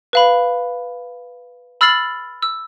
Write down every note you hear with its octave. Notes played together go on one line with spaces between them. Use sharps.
B4 F5 B5
B5 E6 F6 A6 C7 F#7
E6